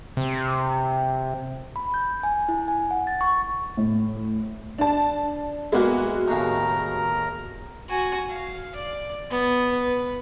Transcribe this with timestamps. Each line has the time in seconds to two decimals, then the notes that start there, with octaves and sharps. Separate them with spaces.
0.17 C3
1.76 B5
1.94 G6
2.23 G#5
2.49 E4
2.68 G#5
2.91 F#5
3.07 A6
3.21 C#6
3.77 A2
4.78 D4 A5
5.72 A#2 G#3 A#3 B3 E4 F#4
6.28 D#2 A2 C#3 A#4 A#5
7.89 F#4 G#5
8.30 F5
8.76 D5
9.30 B3
9.83 B4